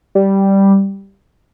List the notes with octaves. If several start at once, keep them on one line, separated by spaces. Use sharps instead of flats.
G3